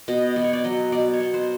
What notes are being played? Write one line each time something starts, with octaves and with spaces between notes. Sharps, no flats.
B2 D#5
B2 D5
C#5
D5
F#3 D#5
B2 D5
C#5
B2
C5